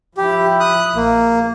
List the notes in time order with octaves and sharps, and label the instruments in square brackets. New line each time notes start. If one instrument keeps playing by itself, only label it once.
[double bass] F3 E4 [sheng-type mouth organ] G4
[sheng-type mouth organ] D#6 F#6
[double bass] A#1 [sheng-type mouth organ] A#3